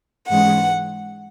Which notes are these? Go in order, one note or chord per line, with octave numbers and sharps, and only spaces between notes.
G#2 E3 G#3 C#4 F#5